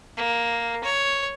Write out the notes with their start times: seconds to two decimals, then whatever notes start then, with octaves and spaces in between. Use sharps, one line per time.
0.17 A#3
0.84 C#5